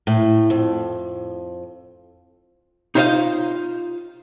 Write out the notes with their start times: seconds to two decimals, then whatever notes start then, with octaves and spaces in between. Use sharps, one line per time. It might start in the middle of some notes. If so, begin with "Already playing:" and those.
0.07 A2
0.50 F2
2.95 D#4 F4 C5 C#5 D#5 F5